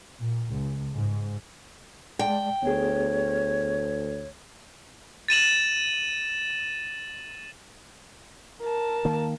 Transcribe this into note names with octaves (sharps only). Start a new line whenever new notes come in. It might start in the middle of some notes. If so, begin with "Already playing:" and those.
A#2
C#2
G#2
G#3 D5 G5 A5
D2 B3 G#4 C#5
A6 D#7 E7 F#7
A#4 A5
D#3 A#3